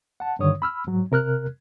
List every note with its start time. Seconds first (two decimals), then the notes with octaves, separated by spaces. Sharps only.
0.20 F#5 A5
0.39 G2 D3 D#3 C#5 D#6
0.62 B5 E6 F6
0.87 G#2 F#3
1.12 C3 A#4 F6 F#6